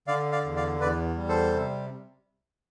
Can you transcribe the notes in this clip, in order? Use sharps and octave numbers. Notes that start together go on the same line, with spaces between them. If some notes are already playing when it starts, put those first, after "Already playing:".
D3 D5 F5
D5 F5
E2
D5 F5
E2 B4 D5
G3
A4 C5
C3